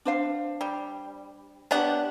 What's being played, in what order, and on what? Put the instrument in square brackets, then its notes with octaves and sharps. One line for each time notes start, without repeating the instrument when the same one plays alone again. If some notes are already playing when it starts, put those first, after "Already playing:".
[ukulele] D4 C5 F5
[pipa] G3
[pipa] B3 D4 F#5 [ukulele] G4 C#5